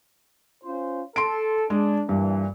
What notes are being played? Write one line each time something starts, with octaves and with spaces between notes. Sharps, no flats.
C#4 F4 C5
A4 C6 D7
G#3 D4
G2 A#2 E3